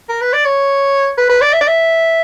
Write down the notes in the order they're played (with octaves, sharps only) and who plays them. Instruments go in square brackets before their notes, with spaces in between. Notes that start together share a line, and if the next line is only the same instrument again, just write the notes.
[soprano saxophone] A#4
B4
D5
C#5
B4
B4
D5
E5
D5
E5